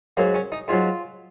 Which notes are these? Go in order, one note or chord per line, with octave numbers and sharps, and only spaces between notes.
G#2 F#3 A#3
C#4
D#4
G#2 F#3 F4